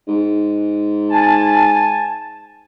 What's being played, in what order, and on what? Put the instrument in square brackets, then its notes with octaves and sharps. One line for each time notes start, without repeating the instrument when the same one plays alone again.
[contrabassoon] G#2
[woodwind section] G#5 A5